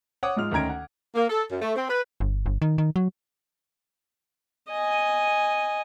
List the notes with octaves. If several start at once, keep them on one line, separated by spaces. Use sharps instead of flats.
C#5 F#5 D6 D#6
G#2 G#3 F4 F6 F7
D2 D#3 C#4 A#5 G#6 D7
F#5
A#3
A4
F#2
A3
C4
B4
G1
G1
D#3
D#3
F#3
D#5 G#5